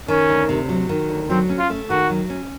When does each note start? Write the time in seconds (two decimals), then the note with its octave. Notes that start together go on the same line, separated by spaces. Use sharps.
0.08 D#3 C#4
0.29 D2
0.49 C3
0.69 F#3
0.89 D#3
1.09 D2
1.30 F#3 C4
1.49 C#4
1.59 F4
1.70 A3
1.90 D#3 F#4
2.09 F#3
2.30 C#4